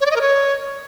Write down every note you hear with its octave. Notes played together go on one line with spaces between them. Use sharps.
C#5
D5
D#5
A#4
C#5